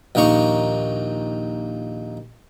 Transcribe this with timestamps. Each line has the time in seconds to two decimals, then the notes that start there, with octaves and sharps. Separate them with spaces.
0.15 A#1 D#2 A#3 D#4 C#6